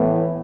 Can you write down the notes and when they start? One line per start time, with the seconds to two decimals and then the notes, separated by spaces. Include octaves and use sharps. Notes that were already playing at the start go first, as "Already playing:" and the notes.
Already playing: A2 E3 B3